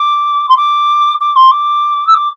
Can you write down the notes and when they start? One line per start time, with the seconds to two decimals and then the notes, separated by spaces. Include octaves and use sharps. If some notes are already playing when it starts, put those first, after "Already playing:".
Already playing: D6
0.49 C6
0.57 D6
1.20 D6
1.35 C6
1.51 D6
2.07 E6
2.14 D6